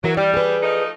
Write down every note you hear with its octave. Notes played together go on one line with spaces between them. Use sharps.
E3 F#3 A#4
G3 D5
G#4 B4
F3 A3 D#4